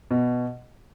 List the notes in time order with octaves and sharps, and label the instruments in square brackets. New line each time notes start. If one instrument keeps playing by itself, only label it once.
[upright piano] B2